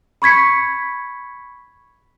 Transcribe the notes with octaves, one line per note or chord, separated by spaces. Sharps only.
B5 C#6 G#6 B6 C#7